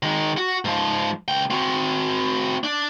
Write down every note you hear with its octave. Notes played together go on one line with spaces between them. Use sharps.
D#3 G#3
F#4
G#2 F3
C#2 G5
C4 F#4
D4